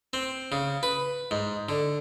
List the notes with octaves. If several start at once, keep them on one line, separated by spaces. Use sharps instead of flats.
C4
C#3
B4
G#2
D3